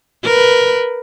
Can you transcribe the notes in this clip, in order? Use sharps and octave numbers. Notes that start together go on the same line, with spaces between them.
A#4 B4